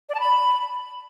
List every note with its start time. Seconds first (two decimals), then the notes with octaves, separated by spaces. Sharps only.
0.09 D5
0.14 A5
0.20 B5